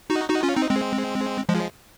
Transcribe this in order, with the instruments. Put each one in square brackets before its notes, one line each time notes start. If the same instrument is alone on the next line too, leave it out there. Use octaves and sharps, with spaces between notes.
[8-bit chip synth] D#4 F#4
D#4 F#4
C#4 F4
C4 D#4
G#3 C4
F3 G#3